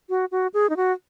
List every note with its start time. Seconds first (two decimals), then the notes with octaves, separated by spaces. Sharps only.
0.09 F#4
0.32 F#4
0.54 G#4
0.70 D#4
0.77 F#4